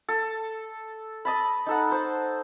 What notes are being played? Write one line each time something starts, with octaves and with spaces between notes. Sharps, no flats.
A4
D#5 A5 B5
D#4 A4 F#5
C5 A5